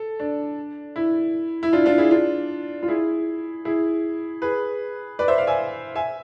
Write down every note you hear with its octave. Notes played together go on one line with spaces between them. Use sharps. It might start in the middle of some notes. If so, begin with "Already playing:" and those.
Already playing: A4
D4
E4
E4
D4 F4
D4 F4
E4 G#4
D4 F4
F4
E4 G#4
E4 G#4
G#4 B4
B4 D5
C5 E5
D5 F5
E5 G#5
E5 G#5